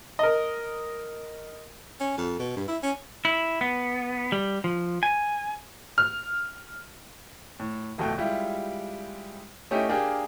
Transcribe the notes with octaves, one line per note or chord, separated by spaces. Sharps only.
A#4 D#5
C#4
F2
B2
G2
E4
C#4
E4
B3
G3
F3
G#5
F6
A2
D1 F2 B2 A3 G5
G3 G#3 E4 F4 G4
A3 C#4 D#4 E4 G4
A#3 D4 G4 G#4 A#4 G5